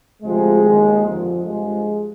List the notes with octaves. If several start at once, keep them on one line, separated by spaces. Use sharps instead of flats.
D2 C3 F3 G#3
D#2 D#3
F2 D3 F3
G2 F3 G#3